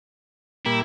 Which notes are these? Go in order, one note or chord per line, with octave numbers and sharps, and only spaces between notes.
A#2 G3 A#3 E4